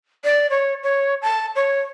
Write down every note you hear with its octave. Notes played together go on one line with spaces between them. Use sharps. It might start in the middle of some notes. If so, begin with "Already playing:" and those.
D5
C#5
C#5
A5
C#5